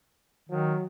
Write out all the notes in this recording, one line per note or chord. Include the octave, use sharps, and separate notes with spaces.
D#3 F#3